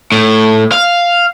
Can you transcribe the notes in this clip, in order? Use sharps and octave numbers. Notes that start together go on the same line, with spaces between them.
A2
F5